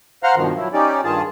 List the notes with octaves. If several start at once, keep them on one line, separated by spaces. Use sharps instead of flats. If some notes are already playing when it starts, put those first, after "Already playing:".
C5 F5 F#5 A#5 C6 F6
G2 B2 D#3 F3
F3 F#3 E4
C#4 D#4 G4 D5
G2 D#3 F4 G#4 A5